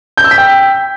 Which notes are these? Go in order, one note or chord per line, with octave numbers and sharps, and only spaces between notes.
G6
E6
B6
G5